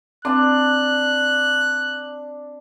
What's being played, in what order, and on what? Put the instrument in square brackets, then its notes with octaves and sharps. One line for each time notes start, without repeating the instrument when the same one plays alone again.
[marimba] C4 [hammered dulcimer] D4 A5 [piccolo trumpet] F#6